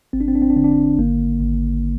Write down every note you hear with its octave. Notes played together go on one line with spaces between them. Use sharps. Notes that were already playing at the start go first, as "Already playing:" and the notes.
G#1 C4
D4
C4
D4
C4
D4
D3 C4
D4
C4
G#1 A#3
G#1